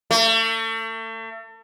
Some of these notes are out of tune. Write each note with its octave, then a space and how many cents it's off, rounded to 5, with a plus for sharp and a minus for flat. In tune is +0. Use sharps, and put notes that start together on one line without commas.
A3 +35